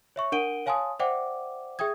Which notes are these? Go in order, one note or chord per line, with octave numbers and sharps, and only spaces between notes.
C#5 E5 C#6
D4 A#4 F#5 D7 D#7 G7
C#5 F5 G#5 A5 C6 D#6
C5 D5 E5 F#5 G5 D6
G#4 E5 G5 D#6 G#6